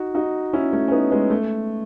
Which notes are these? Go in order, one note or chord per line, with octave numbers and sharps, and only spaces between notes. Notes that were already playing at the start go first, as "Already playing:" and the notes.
Already playing: D#4 F#4
D#4 F#4
C#4 E4
A3 C#4
C#4
B3 D#4
G#3 B3
A3